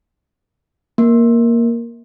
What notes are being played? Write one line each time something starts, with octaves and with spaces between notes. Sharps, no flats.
A#3